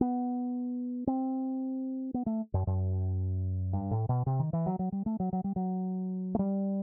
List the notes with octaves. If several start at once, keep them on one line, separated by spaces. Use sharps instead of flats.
B3
C4
B3
A3
F#2
F#2
G2
A2
B2
C3
D#3
E3
F#3
F#3
G3
A3
F#3
F#3
G3
F#3
A3
G3